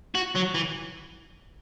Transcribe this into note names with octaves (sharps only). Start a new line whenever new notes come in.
F#4
F#3
E3